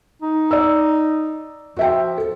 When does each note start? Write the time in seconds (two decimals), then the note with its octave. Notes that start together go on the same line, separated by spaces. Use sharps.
0.22 D#4
0.51 D5 E6
1.77 F3 F#4 E5 G5
2.18 A4